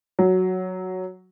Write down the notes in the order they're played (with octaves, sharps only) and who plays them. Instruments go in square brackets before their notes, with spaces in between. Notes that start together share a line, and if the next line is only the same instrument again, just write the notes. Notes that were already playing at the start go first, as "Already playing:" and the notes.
[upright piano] F#3